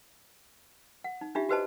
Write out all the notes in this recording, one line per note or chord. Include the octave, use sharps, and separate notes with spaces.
F#5
D#4
D4 D#4 F4 G4 E5
F#4 G4 B4 C5 D#5 A5